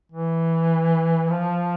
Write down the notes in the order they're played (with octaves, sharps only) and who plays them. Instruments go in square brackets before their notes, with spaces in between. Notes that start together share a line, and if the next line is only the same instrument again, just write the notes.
[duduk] E3
F3